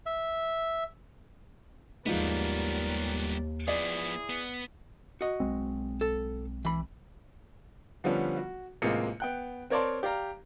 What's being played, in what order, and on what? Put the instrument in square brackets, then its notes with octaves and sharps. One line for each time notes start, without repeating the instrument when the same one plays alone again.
[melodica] E5
[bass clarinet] D#2 [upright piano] G#2 F3 [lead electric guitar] G3 B3 [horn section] A#4 D5
[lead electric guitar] F3 B3 [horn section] E4 G#4 [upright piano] D5
[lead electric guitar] B3
[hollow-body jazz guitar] F#4 D#5
[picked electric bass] B1 G#3 C4
[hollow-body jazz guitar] A4
E3 B5
[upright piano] D3 F3 G3 B3 C#4
F#4
A1 C3 G#3 A#3 F4 C#7
B3 G5 F#6
C4 A#4 C#5 D5 A5 C6
G4 D5 F5 A#5